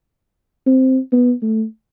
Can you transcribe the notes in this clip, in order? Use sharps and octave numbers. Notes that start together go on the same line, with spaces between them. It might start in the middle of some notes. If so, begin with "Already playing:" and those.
C4
B3
A3